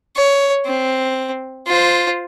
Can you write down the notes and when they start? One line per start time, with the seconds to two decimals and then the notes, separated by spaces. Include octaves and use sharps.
0.16 C#5
0.65 C4
1.67 F4 C5